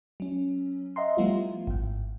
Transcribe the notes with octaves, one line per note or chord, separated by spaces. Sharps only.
F#3 C#4
D#5 E5 F#5 A#5 C6
F3 G3 A3 B3 E4 F4
G#1 G#2